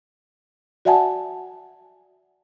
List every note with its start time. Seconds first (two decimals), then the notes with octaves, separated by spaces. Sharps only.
0.85 F#4 D5 E5 F#5 G#5 A5